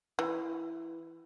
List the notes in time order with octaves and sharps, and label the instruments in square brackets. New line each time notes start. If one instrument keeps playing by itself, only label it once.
[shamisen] E3